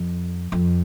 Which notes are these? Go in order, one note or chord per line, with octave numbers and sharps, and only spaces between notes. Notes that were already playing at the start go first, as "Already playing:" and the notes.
Already playing: F2
F2